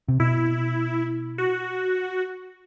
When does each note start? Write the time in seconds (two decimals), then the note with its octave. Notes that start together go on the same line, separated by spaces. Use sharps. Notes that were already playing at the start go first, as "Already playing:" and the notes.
0.08 C3
0.20 B2 E4
1.38 F#4